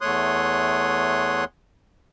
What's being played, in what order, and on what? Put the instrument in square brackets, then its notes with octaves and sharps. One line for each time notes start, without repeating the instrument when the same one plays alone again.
[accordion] E2 A3 C#5 C6 D#6 F#6